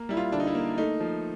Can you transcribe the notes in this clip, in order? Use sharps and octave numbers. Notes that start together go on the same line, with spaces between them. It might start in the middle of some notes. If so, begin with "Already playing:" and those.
Already playing: A#3
G3 E4
F4
D3 D4
D#4
E4
A#3
A3 D#4
F3